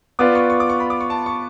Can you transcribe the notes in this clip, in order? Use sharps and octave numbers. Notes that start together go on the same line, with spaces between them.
B3 F4 B4 D5 D6
C#6
C#6
D6
C#6
B5
D6
C#6
A5
C#6